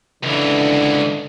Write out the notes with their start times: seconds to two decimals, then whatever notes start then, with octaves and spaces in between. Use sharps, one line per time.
0.23 C#2 D3 E3